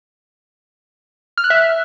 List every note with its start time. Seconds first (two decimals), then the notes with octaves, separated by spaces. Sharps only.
1.38 F6
1.44 F#6
1.50 E5